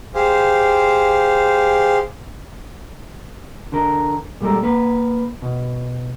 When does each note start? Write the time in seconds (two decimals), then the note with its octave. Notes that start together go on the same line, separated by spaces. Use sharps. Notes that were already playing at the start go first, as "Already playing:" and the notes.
0.15 G4 G#4 C5 F5
3.72 D3 A#4
4.41 A#2 G3 G#3 A4 A#4
4.63 A#3 B4
5.42 B2